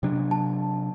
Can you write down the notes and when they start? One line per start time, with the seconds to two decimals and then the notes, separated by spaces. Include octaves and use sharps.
0.03 C3 F#3 D4
0.31 A5